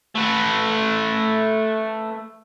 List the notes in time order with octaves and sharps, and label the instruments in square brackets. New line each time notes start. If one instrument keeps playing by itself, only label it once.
[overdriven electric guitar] A3 B4